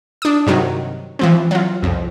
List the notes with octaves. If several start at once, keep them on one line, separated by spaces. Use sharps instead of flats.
D4 D#6
G2 C3 D#3 F#3
E3 F3 C4
F#3 F4
C2 F2